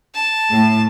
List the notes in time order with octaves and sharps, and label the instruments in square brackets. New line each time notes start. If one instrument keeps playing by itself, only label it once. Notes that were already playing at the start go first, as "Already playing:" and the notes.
[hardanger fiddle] A5
[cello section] A2